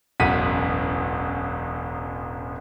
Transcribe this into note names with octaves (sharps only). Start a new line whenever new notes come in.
E1 A1 F#2 F#5 B6 D#7